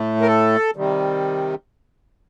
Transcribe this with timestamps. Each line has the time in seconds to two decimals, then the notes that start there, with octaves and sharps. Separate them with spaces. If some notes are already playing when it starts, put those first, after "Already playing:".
Already playing: A2 A3
0.21 A#4
0.27 A4
0.76 C3 D#3 G3